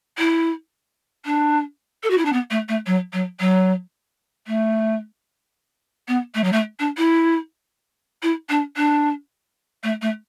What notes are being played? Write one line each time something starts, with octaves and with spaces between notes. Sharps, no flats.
E4
D4
A4
F#4
E4
D4
B3
A3
A3
F#3
F#3
F#3
A3
B3
A3
F#3
A3
D4
E4
E4
D4
D4
A3
A3